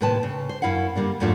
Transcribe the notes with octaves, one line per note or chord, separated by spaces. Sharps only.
D#2 A2 C3 B4 G5 A5
C#3
C5
F#2 C#4 E4 F5 F#5
D3 G3 A#3 D4
F2 G#2 F#3 A3 D4 F4